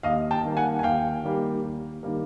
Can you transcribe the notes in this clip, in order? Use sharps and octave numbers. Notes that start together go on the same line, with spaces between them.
D#2 D#5 F5
G5 A5
D#3 G3 A#3
F#5 G#5
G#5
D#2 F5 G5
D#3 G3 A#3
D#2
D#3 G3 A#3